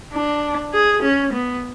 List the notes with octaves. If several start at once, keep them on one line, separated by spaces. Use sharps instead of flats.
D4
G#4
C#4
B3